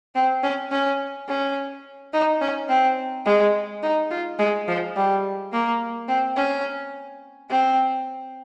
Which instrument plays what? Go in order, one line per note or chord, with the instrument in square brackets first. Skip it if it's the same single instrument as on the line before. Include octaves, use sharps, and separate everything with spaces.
[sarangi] C4
C#4
C#4
C#4
D#4
C#4
C4
G#3
D#4
F4
G#3
F3
G3
A#3
C4
C#4
C4